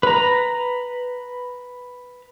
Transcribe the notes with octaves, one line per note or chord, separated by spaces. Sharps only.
B4 A#5